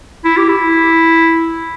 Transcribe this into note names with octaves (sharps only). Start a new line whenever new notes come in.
E4
G4
E4